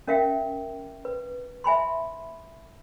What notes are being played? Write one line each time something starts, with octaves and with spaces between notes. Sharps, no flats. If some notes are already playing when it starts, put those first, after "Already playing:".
C#4 A#4 E5 F5 G5
B4
E5 G#5 B5 C6